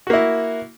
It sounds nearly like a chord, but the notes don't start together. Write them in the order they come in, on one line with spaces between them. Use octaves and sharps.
F#4 A#3 E4